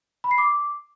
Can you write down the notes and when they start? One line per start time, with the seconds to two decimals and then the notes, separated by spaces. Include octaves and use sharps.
0.24 B5
0.31 C7
0.38 D6